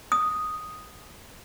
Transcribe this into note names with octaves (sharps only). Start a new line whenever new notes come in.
D#6